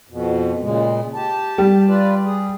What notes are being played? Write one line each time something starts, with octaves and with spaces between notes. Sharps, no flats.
F2 B2
A#2 C#3 G#3
G4 A5
G3
F4 B4 D5
G#4